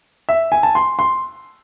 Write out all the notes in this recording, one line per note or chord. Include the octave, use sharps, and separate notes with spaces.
E5
G#5
A5
C6
C6